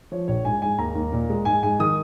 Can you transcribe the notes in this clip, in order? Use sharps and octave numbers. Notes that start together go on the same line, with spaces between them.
F3 C#5
A#1 C#5
G#2 G#5
G#2 G#5
D#2 A#5
D#2
A#2
G#3
G#2 G#5
G#2 G#5
D#3 D#6